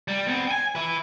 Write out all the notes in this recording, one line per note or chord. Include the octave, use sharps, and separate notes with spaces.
G3
B3 C4
G5 G#5
B4 E5